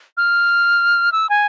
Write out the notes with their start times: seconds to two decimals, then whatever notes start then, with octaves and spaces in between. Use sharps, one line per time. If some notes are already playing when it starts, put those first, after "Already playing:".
0.17 F6
1.12 E6
1.29 G#5